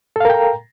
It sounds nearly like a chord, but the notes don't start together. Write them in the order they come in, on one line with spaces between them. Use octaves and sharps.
A4 F5 A#4 G5 A#5